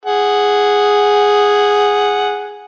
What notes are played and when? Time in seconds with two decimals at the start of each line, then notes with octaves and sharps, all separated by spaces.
0.06 G#4 F#5